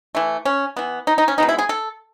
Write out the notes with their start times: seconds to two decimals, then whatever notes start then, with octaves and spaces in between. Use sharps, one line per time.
0.15 E3 A3
0.45 C#4
0.77 E3 B3
1.07 D#4
1.18 D#4
1.28 C#4
1.38 B2 G#3 B3 D#4
1.49 E4
1.58 G#4
1.69 A4